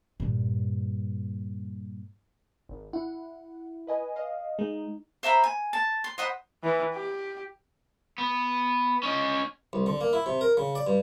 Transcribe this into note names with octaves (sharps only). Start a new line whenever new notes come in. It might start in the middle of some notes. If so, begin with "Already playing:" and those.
G2 A#2
G#1
E4 F#5
B4 D#5 G#5
D#5 F5
G#3 D#4
C5 E5 A#5 B5
G#5
A5
C6
C5 D#5 F#5 B5
E3
G4
B3
C#4 D#5
C2
D3
A#3
E4
C3
A#4
C#3
D5
G2